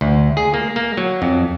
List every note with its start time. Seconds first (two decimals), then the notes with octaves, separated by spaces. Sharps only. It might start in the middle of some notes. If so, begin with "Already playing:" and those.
0.01 D2
0.37 G#4
0.54 A#3
0.76 A#3
0.97 F#3
1.22 F2